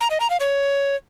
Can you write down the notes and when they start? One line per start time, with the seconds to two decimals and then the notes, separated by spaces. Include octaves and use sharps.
0.01 A#5
0.10 D#5
0.20 A#5
0.30 F5
0.40 C#5